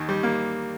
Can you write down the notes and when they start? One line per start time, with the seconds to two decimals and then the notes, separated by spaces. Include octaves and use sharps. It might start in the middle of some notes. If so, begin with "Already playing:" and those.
Already playing: D#2 D#3
0.09 G3
0.23 A#3